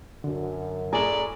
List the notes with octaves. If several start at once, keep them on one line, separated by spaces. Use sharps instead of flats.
F#2 D3
A2 G#4 D5 A#5